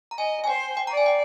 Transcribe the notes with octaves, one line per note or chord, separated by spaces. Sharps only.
A#5
D#5 G#5
G#5
C5 G5
G5
D5 A#5
G#5
G5